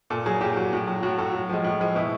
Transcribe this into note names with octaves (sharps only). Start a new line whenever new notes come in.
A#2 A4
F#3 G#4
A#2 G4
F#3 F#4
A2
F#3
A2 F#4
F#3 A4
A2
F3 G#3
A2
F3 G#3
B2 E4